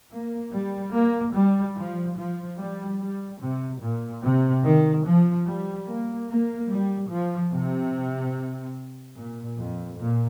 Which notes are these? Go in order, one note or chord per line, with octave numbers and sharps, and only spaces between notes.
A#3
G3
A#3
G3
F3
F3
G3
G3
C3
A#2
C3
D#3
F3
G3
A#3
A#3
G3
F3
C3
A#2
F2
A#2